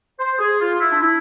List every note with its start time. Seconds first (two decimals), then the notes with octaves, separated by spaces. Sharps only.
0.20 C5
0.39 G#4
0.60 F4
0.80 E4
0.91 D4
1.01 E4